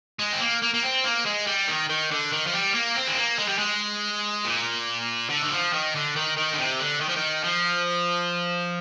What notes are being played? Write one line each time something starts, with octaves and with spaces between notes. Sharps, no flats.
G#3
C4
A#3
A#3
A#3
C4
A#3
G#3
G3
D#3
D#3
D3
D#3
F3
G3
A#3
C4
G#3
A#3
G#3
G3
G#3
A#2
D3
D#3
F3
D#3
D3
D#3
D#3
D3
C3
D3
D#3
F3
D#3
F3